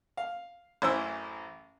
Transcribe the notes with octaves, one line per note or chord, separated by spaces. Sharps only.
F5
A1 F#2 E3 E4 C5 E6